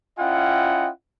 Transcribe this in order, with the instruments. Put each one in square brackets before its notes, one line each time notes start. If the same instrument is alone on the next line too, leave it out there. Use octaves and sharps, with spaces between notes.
[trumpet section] C#4 E4 F4 D#5 F#5 G5